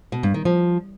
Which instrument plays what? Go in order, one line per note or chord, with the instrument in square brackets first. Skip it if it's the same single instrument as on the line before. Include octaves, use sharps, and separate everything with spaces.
[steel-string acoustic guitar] B2
G2
D#3
F3